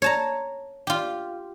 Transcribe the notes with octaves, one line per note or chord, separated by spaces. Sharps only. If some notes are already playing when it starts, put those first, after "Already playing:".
C#5 A5 A#5
F4 G4